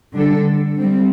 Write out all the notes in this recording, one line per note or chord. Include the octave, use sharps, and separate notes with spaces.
D3 G3 D4 A4
G3 C4